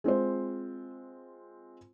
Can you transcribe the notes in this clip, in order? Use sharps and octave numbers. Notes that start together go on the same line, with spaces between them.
G#3 C4 F4 C5